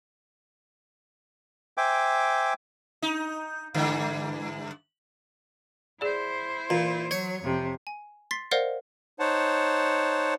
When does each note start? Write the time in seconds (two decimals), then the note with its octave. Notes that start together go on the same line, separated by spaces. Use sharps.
1.77 C5 E5 G5 G#5 D6
3.02 D#4
3.74 G2 D3 E3
6.01 E4 G#4 C5 D5
6.70 A#2 E3
7.11 F#3 C#5
7.43 F2 C3
7.87 G#5
8.31 C6 A6 B6 C7
8.51 A#4 C5 D5 D#5 F5 F#5
9.20 D#4 C5 C#5 F#5 A5